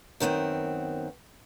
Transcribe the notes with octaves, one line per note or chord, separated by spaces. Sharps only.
F#2 D#3 B3 C4